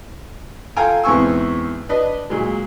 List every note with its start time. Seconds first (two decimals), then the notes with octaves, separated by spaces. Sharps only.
0.76 F4 A4 F5 G5 G#5 A#5
1.04 E2 G#2 C4 G#5 C#6 E6
1.89 D4 B4 D#5
2.30 A#2 F#3 G#3